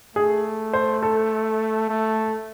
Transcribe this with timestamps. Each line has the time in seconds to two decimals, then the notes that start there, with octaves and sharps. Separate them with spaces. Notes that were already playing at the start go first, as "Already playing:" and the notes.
0.16 A3 G#4
0.73 C5
1.03 A4
1.89 A3